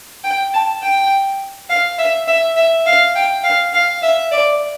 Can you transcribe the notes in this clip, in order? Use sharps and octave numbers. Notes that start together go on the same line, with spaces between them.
G5
A5
G5
F5
E5
E5
E5
F5
G5
F5
F5
E5
D5